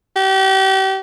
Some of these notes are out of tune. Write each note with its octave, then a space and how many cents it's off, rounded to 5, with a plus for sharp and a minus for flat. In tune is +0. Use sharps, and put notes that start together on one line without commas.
G4 -35